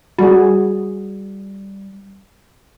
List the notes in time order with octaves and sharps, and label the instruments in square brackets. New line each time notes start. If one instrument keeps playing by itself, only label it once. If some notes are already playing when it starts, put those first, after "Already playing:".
[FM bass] G3 [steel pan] F#4 G#4